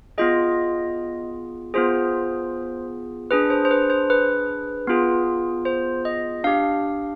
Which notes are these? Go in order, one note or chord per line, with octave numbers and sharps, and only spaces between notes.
B3 F4 G#4 D#5
B3 F4 G#4 C5
D4 G#4 B4
C5
C5
B4
C5
B4
B3 F4 G#4
C5
D#5
D4 G4 F5